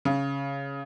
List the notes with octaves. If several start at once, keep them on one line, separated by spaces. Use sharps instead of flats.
C#3